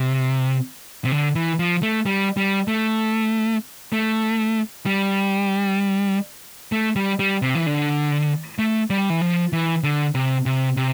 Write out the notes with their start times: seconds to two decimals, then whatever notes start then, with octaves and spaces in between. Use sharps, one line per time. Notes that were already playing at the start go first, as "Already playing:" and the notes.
Already playing: C3
1.05 C3
1.12 D3
1.35 E3
1.59 F3
1.83 A3
2.06 G3
2.37 G3
2.68 A3
3.93 A3
4.86 G3
6.72 A3
6.96 G3
7.19 G3
7.42 C3
7.55 E3
7.66 D3
8.59 A3
8.90 G3
9.10 E3
9.21 F3
9.53 E3
9.83 D3
10.15 C3
10.46 C3
10.77 C3